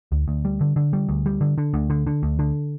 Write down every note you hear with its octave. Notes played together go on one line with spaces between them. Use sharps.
D2
D2
G3
D3
D3
G3
D2
G3
D3
D3
D2
D3
D3
D2
D3